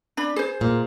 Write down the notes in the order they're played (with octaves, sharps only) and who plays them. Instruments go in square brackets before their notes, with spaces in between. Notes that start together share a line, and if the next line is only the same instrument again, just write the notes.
[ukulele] D4 B5
G#4 C5
[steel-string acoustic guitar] A#2